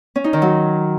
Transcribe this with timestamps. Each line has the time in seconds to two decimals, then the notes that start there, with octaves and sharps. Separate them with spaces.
0.16 C#4
0.24 D#4
0.33 D#3
0.42 F#3